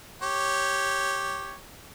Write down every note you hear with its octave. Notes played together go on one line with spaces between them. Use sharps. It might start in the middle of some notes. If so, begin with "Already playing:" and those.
G4 C#5